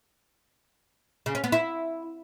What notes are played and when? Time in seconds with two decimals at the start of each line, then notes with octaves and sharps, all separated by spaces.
1.26 C#3
1.35 C#4
1.44 B3
1.52 E4